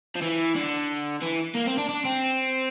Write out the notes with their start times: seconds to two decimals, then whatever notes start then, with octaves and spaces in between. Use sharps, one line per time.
0.15 F3
0.21 E3
0.55 D3
1.22 E3
1.55 A#3
1.67 C4
1.78 D4
1.89 D4
2.05 C4